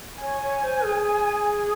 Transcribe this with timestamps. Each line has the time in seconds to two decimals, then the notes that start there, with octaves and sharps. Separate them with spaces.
0.22 C#5 G#5
0.43 C#5
0.63 C5
0.85 G#4
1.05 G#5